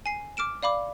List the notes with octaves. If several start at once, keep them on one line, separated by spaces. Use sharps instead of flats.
G#5 C7
D6 F6 D7 E7
D5 F5 B5 D6